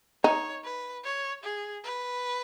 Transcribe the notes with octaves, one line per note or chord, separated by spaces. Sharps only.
D#4 C#5
B4
C#5
G#4
B4